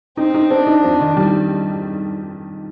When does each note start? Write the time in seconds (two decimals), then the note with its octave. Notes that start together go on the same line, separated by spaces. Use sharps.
0.17 C4 D#4
0.34 D#4
0.51 C4 D4
0.67 D#4
0.84 F2
1.00 D#3
1.17 G3